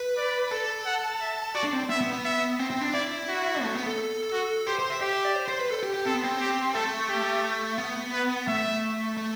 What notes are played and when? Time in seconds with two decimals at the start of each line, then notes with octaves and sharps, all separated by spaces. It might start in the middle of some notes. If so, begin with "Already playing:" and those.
Already playing: B4
0.17 D5
0.51 A4
0.86 F#5
1.21 E5
1.55 F#4 D5
1.64 D4
1.73 C4
1.90 B3 E5
2.01 B3
2.13 B3
2.25 E5
2.59 C4
2.70 C4
2.82 D4
2.93 E4 D5
3.28 F#4
3.62 A3
3.75 B3
3.86 A4
4.33 F#4
4.67 G4 C5
4.79 C5
4.90 E5
5.01 G4 E5
5.13 E5
5.24 D5
5.36 C5
5.48 C5
5.59 B4
5.70 A4
5.83 G4
5.94 G4
6.06 C4 A4
6.14 B3
6.24 C4
6.40 G4
6.75 A3 A4
7.09 G4
7.78 B3
8.13 B4
8.48 A3 E5
9.17 A3